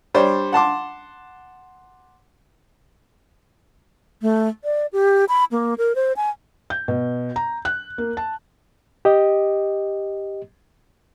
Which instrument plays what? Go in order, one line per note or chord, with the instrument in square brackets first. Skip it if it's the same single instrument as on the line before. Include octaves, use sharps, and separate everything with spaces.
[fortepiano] G3 D4 C5 C#5
F#5 A5 C6 D6
[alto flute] A3
D5
G4
B5
A#3
A#4
C5
G#5
[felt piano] G6
B2
A#5
F#6
A#3
A5
[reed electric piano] G4 D#5